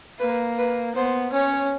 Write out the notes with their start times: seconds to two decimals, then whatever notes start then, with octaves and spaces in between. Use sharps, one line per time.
0.19 A#3 B4
0.58 B4
0.95 B3 C5
1.33 C#4 C#5